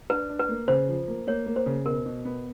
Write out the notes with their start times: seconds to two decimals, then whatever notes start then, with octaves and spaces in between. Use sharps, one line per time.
0.10 D4 B4
0.29 D4
0.39 B4
0.49 A#3
0.68 C#3 C5
0.89 F3
1.08 A#3
1.27 A#3 C#5
1.46 A#3
1.56 C5
1.66 C#3
1.86 B2 A#4
2.06 B2
2.25 B3